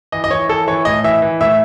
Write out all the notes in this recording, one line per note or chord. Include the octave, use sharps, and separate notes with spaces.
E3 D#5
D#5
E3 C#5
E3 A4
E3 C#5
A2 D#5
E3 E5
E3
A2 E5